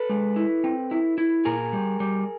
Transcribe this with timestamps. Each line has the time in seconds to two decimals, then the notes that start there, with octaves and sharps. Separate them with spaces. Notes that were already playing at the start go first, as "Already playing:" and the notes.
Already playing: A4 B4
0.09 G#3
0.36 E4
0.64 C4
0.91 E4
1.18 E4
1.45 A#2 G#4 A#4
1.73 G3
2.00 G3